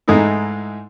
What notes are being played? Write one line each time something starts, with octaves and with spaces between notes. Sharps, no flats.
G#2 E3 G#3 A3 D#4 E4